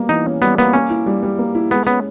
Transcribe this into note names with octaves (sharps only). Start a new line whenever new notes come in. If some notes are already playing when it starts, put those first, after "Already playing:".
Already playing: G3 A#3 B3
E3 D#4
C#4
G3 B3
A#3 B3
A#3 C#4
E4
G3
G3
A#3
E4
G#3 B3
B3 C#4